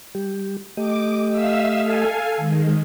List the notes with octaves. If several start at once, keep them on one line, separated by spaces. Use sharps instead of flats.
G3 G4
A3 G4 D#5 D6
E5 F5 E6
A4 F5 G#5
D#3 G#3